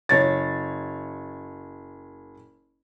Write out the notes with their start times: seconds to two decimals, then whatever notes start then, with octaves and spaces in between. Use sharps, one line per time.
0.09 F#1 C#5 A6